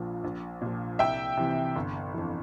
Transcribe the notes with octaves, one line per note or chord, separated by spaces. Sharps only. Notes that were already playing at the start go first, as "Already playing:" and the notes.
Already playing: A#1 A#2 F3
A#1
A#2 F3
C2 E5 G5
C3 E3
G1
F2 E3